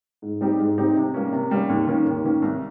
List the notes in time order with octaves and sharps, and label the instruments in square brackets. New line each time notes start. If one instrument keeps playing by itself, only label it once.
[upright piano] G#2
G3 C4 D#4 G4
G#2
G3 C4 D#4 G4
C3
G3 A#3 C#4
C3
G3 A#3 C#4
D#2
D#3 A#3 C#4
D#2
D#3 A#3 C#4
C2